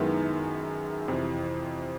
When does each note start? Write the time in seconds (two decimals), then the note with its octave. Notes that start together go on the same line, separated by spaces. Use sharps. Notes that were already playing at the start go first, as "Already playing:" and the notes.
Already playing: F#2 D#3 G#3 B3 E4
1.08 F2 C3 E3